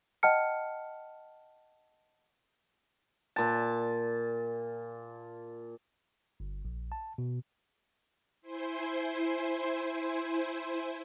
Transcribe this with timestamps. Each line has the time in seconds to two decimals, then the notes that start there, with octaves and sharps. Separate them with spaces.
0.23 D#5 F#5 G5 A5 F6 C#7
3.36 A#2 A5
6.40 G1
6.65 A#1
6.92 A5
7.18 B2
8.41 E4 C5 G#5 C6